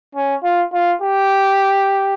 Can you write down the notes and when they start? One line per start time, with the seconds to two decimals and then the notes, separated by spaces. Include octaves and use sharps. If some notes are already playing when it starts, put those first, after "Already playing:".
0.15 C#4
0.43 F4
0.73 F4
1.02 G4